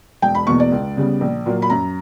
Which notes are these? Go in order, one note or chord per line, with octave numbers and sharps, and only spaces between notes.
E1 G5
B5
E2 B2 A#3 C#6
D5
C#2
C#3 G3 B3
A#1
A#2 F#3 A#3
B5
F#2 A#5